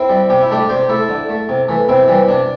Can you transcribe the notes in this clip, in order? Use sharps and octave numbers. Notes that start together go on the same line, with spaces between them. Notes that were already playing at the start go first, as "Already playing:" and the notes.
Already playing: C4 E4
G3
C3 G4
E4
A3 D4 G4
C3 G4 C5
A3 E4 A4
D3
A3
C3
E3 A3
C3 C4 E4
E3 G3
C3 D4